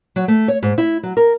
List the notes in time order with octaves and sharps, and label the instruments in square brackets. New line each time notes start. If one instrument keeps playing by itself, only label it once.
[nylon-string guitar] F#3
A3
C#5
G#2
E4
F#3
A#4